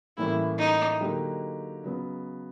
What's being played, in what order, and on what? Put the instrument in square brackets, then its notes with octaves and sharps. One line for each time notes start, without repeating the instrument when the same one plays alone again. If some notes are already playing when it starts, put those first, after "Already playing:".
[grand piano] A2 E3 G3 A#3 C#4 [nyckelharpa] E4
[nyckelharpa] D#4
[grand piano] D3 F#3 A#3 D#4 G4
C#3 F#3 B3